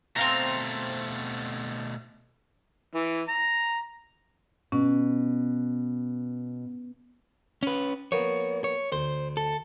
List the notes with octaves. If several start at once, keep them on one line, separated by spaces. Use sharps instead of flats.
B2 A3 C4 F5 A#5
E3
A#5
B2 C#4
C#4 B4
F3 A#3 B3 C#5
C#5
D2 C5
A4